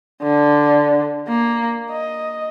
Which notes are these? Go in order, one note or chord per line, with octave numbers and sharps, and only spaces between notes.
D3
A#3
D#5